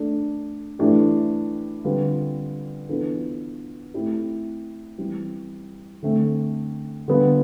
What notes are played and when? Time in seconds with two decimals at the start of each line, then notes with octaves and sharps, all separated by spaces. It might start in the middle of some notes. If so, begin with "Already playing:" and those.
Already playing: A3 D4 A4
0.79 E3 A3 D4 G4
1.84 D3 G3 C4 F4 B4
2.89 E3 B3 D4 F4 A4
3.94 A3 C4 E4 G4
4.98 E3 G3 C4
6.03 D3 A3 C4
7.08 D3 G3 B3 F4